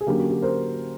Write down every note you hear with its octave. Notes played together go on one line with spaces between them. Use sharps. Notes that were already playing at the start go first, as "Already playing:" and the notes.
G#4
D3 F#3 A#3 C#4 G4
F#4
G4
A#4 C5